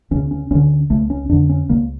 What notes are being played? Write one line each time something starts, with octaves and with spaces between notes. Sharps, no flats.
D2 C#3 C#4
C#4
D2 D3 C#4
C#2 C#3 A3
C#4
F2 D3 D4
C#4
C#2 C#3 A#3